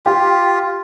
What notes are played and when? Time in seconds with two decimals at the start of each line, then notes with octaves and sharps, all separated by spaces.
0.06 F4 G4